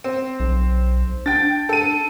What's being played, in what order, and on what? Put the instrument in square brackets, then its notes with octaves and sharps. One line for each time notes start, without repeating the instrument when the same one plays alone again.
[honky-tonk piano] C4
[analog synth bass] B1
[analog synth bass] D4 [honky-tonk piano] G5 A6
[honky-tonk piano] A4 D#7